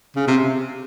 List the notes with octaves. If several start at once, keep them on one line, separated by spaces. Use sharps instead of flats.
C#3
C3